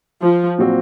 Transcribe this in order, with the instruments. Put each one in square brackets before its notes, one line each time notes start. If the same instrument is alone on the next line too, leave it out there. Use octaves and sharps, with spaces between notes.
[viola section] F3
[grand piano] A#2 F#3 C4 F#4